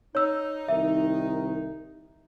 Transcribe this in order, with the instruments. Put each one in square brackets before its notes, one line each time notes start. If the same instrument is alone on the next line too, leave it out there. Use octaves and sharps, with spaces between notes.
[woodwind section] D#4 [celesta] C#5 E6
[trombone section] C2 D#3 [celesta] E5